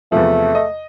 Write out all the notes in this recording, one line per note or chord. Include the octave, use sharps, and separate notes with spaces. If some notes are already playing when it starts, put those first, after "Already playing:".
E2 C3 F3 A3
D#5